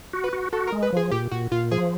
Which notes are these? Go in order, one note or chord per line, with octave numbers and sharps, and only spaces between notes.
F#4
B4
F#4
F#4 A4
A#4
G#3
B4
F3 G#4
A#2 G4
A#2 F#4
A#2 F4
F3 G#4